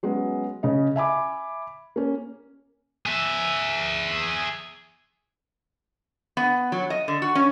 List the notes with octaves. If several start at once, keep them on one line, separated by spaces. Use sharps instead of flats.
F#3 G#3 B3 C#4
C#3 C#4 D#5
E5 G#5 B5 D6
A#3 C#4
G#4 E5
B3
F#3
D#5
D3
F#4
C#4